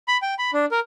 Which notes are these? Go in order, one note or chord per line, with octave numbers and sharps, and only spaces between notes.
B5
G5
B5
D4
A#4